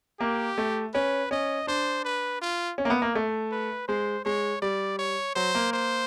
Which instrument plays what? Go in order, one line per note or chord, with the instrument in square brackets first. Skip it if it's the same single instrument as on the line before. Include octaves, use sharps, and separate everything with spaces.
[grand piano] A#3 [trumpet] G4
[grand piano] A3
[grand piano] C#4 [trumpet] B4
[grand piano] C#4 [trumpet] D#5
[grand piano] D4 [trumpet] C5
[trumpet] B4
F4
[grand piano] C#4
A#3
B3
A#3
A3
[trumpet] B4
[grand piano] G#3 [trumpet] C5
[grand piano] G#3 [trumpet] C#5
[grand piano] G3 [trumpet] D5
[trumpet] C#5
[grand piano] F#3 [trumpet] C5
[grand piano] A#3
[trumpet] C5